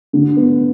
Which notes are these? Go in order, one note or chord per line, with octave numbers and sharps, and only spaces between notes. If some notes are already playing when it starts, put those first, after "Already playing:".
D3
B3